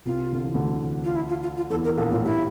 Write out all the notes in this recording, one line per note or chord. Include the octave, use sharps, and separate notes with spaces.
C2 C3 F4
D3
E3
D2 D3
F4
E4
F4
F4
F4
E2 E3 A4
A#4
A#1 A#2 A4
A2 F4
G2 E4